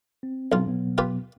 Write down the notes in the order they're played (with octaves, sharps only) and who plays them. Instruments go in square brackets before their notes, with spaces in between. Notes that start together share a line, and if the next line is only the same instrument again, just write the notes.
[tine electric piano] C4
[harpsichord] B1 F4
[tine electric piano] B2 F#3 B3
[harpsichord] F4 G4 B4